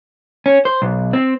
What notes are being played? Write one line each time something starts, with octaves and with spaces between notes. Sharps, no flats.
C#4
C5
B1
C4